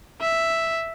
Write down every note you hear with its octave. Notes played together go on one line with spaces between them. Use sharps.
E5